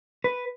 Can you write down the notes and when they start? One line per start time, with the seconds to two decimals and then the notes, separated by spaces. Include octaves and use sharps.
0.24 B4